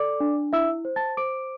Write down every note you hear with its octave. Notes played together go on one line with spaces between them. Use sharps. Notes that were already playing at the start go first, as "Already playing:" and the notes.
Already playing: A4 D5 D6
D4
E4 E5 E6
C5
A5 A6
C5 D6 D7